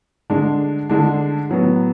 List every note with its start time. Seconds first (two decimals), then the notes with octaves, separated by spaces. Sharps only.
0.30 D3 G#3 D4
0.90 D3 G#3 D4
1.49 A2 F#3 B3